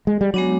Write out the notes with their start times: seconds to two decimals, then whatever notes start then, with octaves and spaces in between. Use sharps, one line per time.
0.07 G#3
0.21 G3
0.34 F#3 G#3 B3 D4